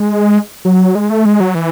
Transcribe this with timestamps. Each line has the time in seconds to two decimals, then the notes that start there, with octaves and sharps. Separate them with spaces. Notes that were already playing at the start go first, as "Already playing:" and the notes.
Already playing: G#3
0.65 F#3
0.95 G#3
1.10 A3
1.25 G#3
1.40 F#3
1.55 E3